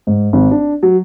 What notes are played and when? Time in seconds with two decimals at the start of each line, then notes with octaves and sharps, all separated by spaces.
0.07 G#2
0.33 G#1
0.51 D4
0.83 F#3